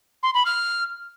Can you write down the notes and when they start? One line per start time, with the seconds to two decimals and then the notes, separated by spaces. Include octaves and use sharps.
0.23 C6
0.34 B5
0.45 F6